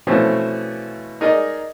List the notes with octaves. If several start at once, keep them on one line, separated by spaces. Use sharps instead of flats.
B2 E3 F3 A3 C4 C#4
D#4 G#4 A#4 D5 D#5